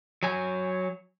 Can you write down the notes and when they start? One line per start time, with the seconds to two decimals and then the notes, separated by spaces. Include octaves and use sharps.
0.23 F#3 G#5